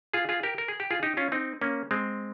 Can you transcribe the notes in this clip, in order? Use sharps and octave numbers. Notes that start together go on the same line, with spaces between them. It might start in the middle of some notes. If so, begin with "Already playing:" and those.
F4 G#4
F4 G#4
G4 A#4
A#4
G#4
G4
F4 G#4
D#4 G4
C#4 F4
C4 D#4
A#3 C#4
G#3 C4